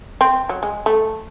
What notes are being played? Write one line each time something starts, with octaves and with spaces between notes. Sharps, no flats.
C4
F#3
G#3
A3